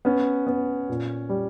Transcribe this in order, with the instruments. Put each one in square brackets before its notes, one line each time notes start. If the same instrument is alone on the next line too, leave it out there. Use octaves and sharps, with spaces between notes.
[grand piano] B3 [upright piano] C#4
[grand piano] B3
A#2
G3